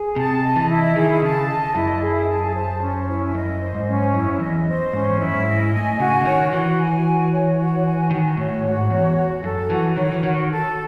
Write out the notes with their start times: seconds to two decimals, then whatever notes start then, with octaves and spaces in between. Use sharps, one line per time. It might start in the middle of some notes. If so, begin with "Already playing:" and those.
Already playing: G#4
0.16 C3 A5
0.42 D#5
0.56 E3
0.69 E4
0.96 D#3 G#4
1.22 C#3 A5
1.48 D#5
1.75 F#2 E4
2.02 G#4
2.28 A5
2.54 C5
2.81 C#4
3.07 E4
3.35 F#2 D#5
3.60 C5
3.74 G#2
3.87 C#4
4.14 F#2 E4
4.40 E2 D#5
4.67 C5
4.93 G#2 C#4
5.10 E2
5.19 F#2 E4
5.32 G#2
5.46 D#5
5.73 A2 G#5
6.00 C#3 F#4
6.21 C#3
6.25 D#3 C#5
6.52 E3 F#4
6.79 G#5
7.05 F#4
7.31 C#5
7.58 F#4
7.85 G#5
8.11 D#3 F#4
8.37 A2 C#5
8.64 G#2 F#4
8.90 E2 C#5
9.17 F#4
9.44 F#2 A4
9.70 E3 F#4
9.96 D#3 C#5
10.12 E3
10.23 D#3 F#4
10.50 A4